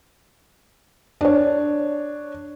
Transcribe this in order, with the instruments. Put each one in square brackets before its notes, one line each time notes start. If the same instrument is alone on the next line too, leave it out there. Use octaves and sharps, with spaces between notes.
[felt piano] D4 C#5